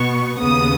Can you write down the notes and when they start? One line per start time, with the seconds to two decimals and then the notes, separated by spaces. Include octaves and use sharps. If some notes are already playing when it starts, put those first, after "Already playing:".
Already playing: B2 B3 C#6
0.41 D#2 C#3 B3 D#6